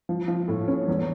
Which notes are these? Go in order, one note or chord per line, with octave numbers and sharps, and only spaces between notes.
F3
F3
A2
C#4
E2